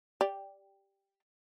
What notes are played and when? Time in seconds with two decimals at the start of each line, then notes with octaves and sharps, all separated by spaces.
0.21 G4 D5